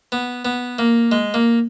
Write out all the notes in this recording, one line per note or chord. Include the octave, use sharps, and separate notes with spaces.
B3
B3
A#3
G#3
A#3